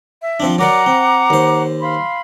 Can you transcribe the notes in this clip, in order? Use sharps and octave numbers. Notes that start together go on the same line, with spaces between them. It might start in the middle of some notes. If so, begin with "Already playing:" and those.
E5
F3 C4 D4
F#3 A#4 D5 F#5 A#5 D6
C4
D#2 C5
F5 B5 C6